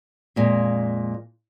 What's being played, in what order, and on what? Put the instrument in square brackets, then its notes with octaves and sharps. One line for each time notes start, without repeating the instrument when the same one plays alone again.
[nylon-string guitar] F2 A#2 G#3